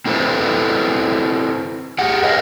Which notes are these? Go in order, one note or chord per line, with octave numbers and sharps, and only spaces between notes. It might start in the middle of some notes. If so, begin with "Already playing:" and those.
C4 E4 A4 B4 C5
G4 G#4 F#5
A#4 B4 C#5 D#5 F5